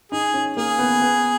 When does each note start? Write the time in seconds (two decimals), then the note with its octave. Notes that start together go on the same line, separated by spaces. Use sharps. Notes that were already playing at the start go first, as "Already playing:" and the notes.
0.12 D#4 G#4
0.34 C#4
0.57 A#3 G#4
0.79 B3
1.02 B3